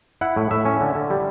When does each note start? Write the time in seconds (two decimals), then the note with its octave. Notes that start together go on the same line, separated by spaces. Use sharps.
0.21 E4 F#5
0.37 A2
0.51 A2 E5
0.65 C#4
0.81 D3
0.95 D3
1.10 G3